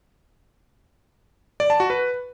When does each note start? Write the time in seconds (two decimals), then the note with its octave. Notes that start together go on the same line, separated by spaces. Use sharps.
1.60 D5
1.70 A5
1.80 F#4
1.90 B4